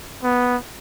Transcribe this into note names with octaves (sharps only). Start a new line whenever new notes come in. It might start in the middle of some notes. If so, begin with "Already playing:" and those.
B3